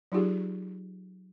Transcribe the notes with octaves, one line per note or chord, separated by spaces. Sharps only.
F#3 D#4 F4 G4 G#4